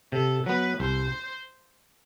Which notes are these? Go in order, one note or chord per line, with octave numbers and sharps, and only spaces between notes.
C3 A4
F#3 B3 B4
C2 C5